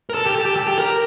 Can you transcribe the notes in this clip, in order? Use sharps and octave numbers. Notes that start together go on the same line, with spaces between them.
A#4
A4
G4
A4
G4
A4
G4
A#4